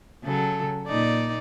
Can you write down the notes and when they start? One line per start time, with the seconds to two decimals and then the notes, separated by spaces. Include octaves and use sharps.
0.24 C#3 F#3 A4
0.87 A#2 D#4 D5